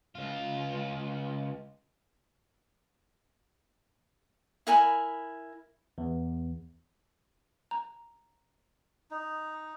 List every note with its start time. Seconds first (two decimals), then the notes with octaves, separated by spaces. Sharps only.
0.15 C#2 F4
4.67 E4 A#4 G#5 B5
5.98 E2
7.71 A#5
9.11 D#4